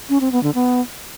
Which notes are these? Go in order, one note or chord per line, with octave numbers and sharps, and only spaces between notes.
C#4
C4
B3
D3
B3